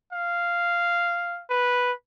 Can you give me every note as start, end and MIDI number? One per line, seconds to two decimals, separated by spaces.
0.13 1.42 77
1.50 1.92 71